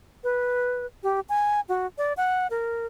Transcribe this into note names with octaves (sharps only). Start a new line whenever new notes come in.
B4
G4
G#5
F#4
D5
F#5
A#4